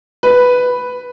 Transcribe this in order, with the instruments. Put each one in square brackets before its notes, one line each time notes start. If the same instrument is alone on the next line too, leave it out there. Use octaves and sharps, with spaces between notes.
[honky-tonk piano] B4